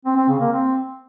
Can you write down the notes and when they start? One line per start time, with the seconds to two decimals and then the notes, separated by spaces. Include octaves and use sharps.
0.05 C4
0.17 C4
0.29 C#3
0.40 A#3
0.52 C4